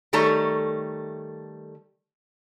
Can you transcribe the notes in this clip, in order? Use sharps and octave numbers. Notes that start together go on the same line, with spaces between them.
D#3 G3 A3 A4 C#5 A#5